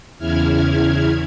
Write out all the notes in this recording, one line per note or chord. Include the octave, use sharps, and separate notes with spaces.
E2 C#3 E4 F6 G#6